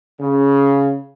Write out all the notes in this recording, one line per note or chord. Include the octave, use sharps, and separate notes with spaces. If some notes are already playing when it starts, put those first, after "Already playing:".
C#3